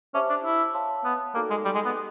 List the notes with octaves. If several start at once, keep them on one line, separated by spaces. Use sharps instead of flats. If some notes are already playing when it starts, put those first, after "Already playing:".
C#4 G4 C5 E5 A5 D6
D4
E4
C#5 F5 A5 C6
B3
A#3 D#4 F#4 A4 D5 G5
G#3
G3
G#3
B3
G4